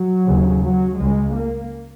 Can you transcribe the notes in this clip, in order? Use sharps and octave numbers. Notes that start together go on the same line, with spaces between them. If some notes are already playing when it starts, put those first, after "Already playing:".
Already playing: F#3
D#2 C#3
F#3
C#2 C#3 G#3
A#3